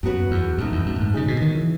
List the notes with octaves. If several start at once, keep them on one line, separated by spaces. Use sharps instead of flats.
F#2 F#3 B3 F#4 B4
E2
F#2 B2 A3 D#4
E2
F#2
G#2
C#3 F#3 B3 D#4 G#4
B2
D#3
E3